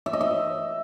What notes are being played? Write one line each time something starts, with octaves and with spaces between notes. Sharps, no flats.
E5
D#5
E5